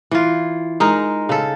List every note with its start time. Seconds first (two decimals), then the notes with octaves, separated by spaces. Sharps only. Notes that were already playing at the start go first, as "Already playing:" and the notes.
0.11 E3 F4
0.80 G#3 D#4 A#4
1.29 C#3 A4